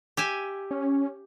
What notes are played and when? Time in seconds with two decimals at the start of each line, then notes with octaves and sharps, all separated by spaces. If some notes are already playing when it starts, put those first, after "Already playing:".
0.17 G4 E5 G#5
0.71 C#4